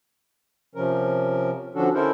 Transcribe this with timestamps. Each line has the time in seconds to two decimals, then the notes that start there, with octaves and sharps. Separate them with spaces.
0.75 C3 F3 C#4 A#4
1.75 D3 F3 C#4 D4 F#4 A4
1.94 C#4 D#4 E4 A4 A#4 C5